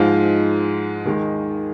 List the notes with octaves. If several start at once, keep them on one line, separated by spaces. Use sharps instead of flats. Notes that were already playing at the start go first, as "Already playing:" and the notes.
Already playing: G#2 F3 G#3 F4
D#2 D#3 G#3